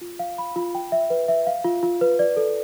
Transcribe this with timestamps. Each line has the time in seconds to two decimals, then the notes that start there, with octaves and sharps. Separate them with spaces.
0.01 F4
0.19 F5
0.38 B5
0.56 F4
0.75 G5
0.92 E5
1.10 B4
1.28 E5
1.47 F5
1.64 F4
1.83 F4
2.01 B4
2.19 D5
2.37 A4